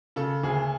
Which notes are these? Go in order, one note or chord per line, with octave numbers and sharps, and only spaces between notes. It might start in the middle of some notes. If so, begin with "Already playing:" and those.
C#3 A4
D2 G#4